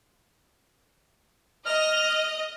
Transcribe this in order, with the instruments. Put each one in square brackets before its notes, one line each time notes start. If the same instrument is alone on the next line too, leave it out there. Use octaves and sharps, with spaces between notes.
[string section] D#5 [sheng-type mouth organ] F6